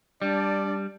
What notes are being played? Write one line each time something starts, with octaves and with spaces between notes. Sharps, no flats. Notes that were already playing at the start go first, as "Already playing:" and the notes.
G3 D4 D5